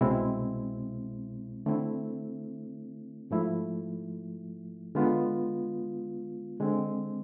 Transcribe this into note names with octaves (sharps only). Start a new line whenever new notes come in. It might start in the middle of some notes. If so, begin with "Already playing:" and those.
C2 B2 G#3 C4 E4
D3 A3 C4 E4
G#2 F3 A3 E4
D3 G#3 B3 F4
D3 G#3 C4